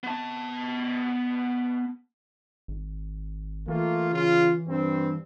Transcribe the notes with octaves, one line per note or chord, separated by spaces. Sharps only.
B3 A5
G#1
E3 A3 A#3 F4
C#3 F4
G2 C4